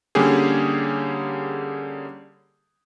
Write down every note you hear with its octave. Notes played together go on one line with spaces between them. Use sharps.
D3 G3 A#3 C#4 G4 G#4